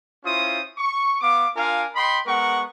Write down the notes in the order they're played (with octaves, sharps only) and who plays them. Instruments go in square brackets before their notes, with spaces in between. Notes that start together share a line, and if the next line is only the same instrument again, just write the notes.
[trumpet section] C#4 E4 F4 C5 D#6
C#6
B3 F5 D6
D4 F4 A#4 F5 G#5
D#5 G5 B5 C6
G#3 B3 A#4 F#5 C#6